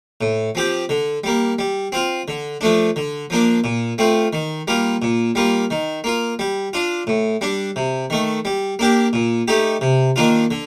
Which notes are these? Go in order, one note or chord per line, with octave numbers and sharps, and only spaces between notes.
A2
F3 C4 G4
D3
G3 A#3
G3
C4 F4
D3
F3 A3 D4
D3
F3 A#3 D4
A#2
A3 C4 F4
D#3
G3 A#3 F4
A#2
G3 A#3 F4
D#3
A#3 F4
G3
D4 F4
A2
G3 D4
C3
D#3 A3
G3
A#3 D4 G4
A#2
A3 D#4 G4
C3
D#3 A#3 D4 F4
D3